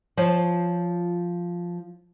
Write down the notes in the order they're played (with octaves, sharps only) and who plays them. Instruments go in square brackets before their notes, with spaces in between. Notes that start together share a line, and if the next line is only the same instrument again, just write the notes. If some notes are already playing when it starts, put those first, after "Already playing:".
[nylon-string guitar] F3 F4 C5 C#5